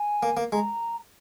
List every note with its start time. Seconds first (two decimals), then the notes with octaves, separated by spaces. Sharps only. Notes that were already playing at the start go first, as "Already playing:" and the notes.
Already playing: G#5
0.23 A#3
0.37 A#3
0.52 G#3 A#5